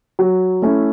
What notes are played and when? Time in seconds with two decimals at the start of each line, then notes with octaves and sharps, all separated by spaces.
0.19 F#3
0.62 A3 C#4 E4